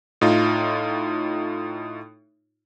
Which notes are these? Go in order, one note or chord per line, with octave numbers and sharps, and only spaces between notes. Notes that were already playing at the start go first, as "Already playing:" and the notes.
A2 D#4 F4